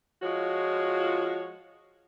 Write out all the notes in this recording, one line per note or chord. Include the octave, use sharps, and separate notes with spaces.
F3 G#3 F4 F#4 C#5